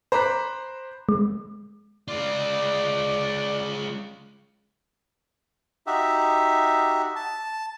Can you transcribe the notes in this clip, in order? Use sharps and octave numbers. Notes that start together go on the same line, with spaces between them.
C5 A#5 B5 D6 F#6 B6
G#3
G#3 F4 D5
D#4 F#4 G4 E5
A5